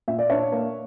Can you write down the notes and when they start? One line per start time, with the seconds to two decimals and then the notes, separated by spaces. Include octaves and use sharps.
0.08 A#2 E5
0.19 D5
0.30 D4 C#5 E5
0.52 A#3